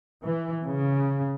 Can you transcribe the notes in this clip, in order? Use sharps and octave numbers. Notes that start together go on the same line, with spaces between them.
E3
C#3